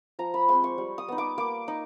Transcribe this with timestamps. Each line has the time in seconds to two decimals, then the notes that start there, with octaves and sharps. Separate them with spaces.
0.19 F3 A#5
0.34 B5
0.48 G#3 C4 C6
0.64 C#6
0.78 G3
0.98 D#6
1.08 B3 D#4
1.18 D6
1.38 A#3 D6
1.68 D#4